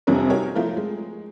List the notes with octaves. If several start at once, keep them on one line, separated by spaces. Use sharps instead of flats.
F1 F2 C3 G3 A#4 C#5
D#4 F#4 G4 A#4 C#5
F3 A3 E4 F4 A#4
G#3